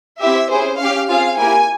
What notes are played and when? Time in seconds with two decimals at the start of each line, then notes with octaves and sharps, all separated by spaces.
0.21 C4 E4 G4 E5
0.51 C#4 E4 G#4 C5
0.80 C#4 G4 F5
1.09 C4 F4 G#4 F5
1.39 A#3 E4 G4 G#5